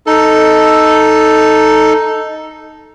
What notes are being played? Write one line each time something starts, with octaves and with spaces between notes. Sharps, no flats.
D#4 A4